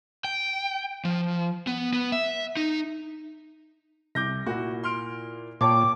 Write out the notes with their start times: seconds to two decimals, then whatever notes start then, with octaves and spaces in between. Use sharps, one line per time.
0.24 G5
1.05 F3
1.67 B3
1.93 B3
2.12 E5
2.57 D#4
4.15 C2 D6 G6 A#6
4.46 A#2 E4 F#4
4.84 C6 F6 D7
5.61 A#2 C#5 G5 A5 C6 D6